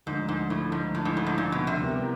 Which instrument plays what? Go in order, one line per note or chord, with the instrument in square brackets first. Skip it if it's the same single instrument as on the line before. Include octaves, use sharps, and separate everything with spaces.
[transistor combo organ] D2 D3 F3 [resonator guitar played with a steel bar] G#2
[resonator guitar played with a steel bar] G#2
A2
G#2
A2
G#2
A2
G#2
A#2
B2
C3
[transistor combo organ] G3 B3 E4 G4 A#4